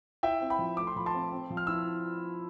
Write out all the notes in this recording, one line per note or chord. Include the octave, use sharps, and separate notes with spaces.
E4 E5 G5
C4
G5 B5
F3
A3 D6
C6
F3 B5
A5 C6
C4
C4
F3
F6
E4 E6